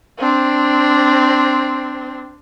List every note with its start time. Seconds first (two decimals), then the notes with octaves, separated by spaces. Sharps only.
0.19 C4 D4